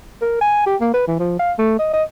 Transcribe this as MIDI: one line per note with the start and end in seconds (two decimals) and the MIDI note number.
0.22 0.39 70
0.41 0.66 80
0.67 0.76 67
0.81 0.93 58
0.94 1.06 71
1.08 1.19 52
1.19 1.38 53
1.39 1.53 77
1.59 1.77 57
1.79 1.93 75
1.93 2.03 75